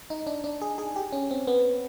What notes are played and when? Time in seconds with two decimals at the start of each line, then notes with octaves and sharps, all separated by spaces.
0.10 D#4
0.27 D4
0.44 D4
0.62 G#4
0.78 G#4
0.96 G4
1.12 C#4
1.31 C4
1.47 B3